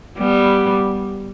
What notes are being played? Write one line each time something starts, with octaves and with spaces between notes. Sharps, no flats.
G3 B3